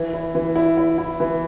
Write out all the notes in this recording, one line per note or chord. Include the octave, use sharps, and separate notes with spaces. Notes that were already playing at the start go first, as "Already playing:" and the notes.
Already playing: E3
E4
E3
E4
E4
E4
E3